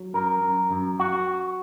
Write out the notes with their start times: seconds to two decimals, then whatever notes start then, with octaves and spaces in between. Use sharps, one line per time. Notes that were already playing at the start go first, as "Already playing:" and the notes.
Already playing: F#3
0.14 F#2 A#4
0.42 F#2
0.71 F#2
1.00 F#4